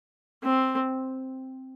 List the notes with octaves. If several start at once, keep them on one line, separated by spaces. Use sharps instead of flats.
C4